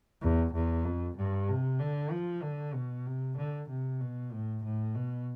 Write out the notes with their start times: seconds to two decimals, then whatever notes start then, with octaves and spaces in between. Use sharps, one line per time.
0.22 E2
0.54 E2
0.85 F2
1.17 G2
1.48 C3
1.80 D3
2.11 F3
2.43 D3
2.74 B2
3.06 C3
3.37 D3
3.69 C3
4.00 B2
4.32 A2
4.64 A2
4.95 B2